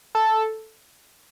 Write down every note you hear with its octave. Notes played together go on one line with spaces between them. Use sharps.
A4